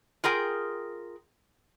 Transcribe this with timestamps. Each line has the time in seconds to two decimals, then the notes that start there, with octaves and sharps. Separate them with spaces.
0.24 F4 G#4 A#4 G5